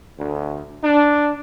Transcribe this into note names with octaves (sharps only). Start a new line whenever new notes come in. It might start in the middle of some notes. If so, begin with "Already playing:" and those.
D2
D4